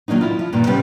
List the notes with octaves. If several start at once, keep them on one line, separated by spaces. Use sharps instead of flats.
D#3 F#3 A#3 D4 D#4
E4 F4
F3
G2 A#2 D#3
C3 F3 G3 B3 C#4